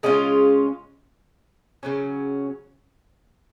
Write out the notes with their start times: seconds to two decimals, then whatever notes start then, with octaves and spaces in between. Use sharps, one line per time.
0.03 C#3 G#3 C#4 F4
1.83 C#3 F#3 C#4